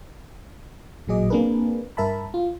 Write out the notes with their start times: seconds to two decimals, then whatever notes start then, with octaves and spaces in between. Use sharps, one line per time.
1.07 A1 A#2 F#3 G#4 D#5 D6
1.30 A#3 C4 D4 G#4 A#4 B4
1.97 G2 A#4 E5 A5 B5
2.34 F4